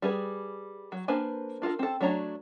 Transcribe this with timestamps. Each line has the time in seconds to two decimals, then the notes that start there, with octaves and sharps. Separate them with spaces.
0.02 G3 G#4 B4
0.92 F#3
1.08 A#3 D4 B4 C5 G#5
1.62 D4 F4 A4 A#4
1.79 C4 A4
2.01 F#3 A3 D4 C#5 A#5